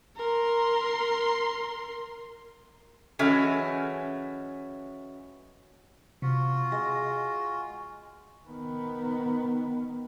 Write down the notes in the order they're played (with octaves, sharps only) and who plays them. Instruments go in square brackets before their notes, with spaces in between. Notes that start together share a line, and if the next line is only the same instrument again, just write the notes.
[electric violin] A#4 C6
[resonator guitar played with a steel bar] E3 F#3 G#3 A3 C#4
[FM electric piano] C3 [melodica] F4 F#4
[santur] G#3 [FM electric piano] A#6
[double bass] D#3 B3